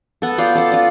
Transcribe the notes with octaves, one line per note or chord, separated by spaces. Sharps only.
B3 A4
F4 D5 F5 G5
A4 D5
F4 D5